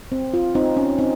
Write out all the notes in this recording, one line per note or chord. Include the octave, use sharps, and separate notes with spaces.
C4
F4
C4 D#4
C#4
C4 D#4